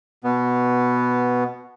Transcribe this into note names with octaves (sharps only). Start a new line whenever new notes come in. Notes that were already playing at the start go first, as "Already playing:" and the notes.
B2 B3